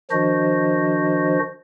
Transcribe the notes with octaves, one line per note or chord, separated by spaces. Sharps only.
D#3 F3 D4 F#4 C5 D#5